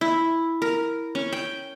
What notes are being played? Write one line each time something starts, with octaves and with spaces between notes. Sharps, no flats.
E4
A#4
C#4
G5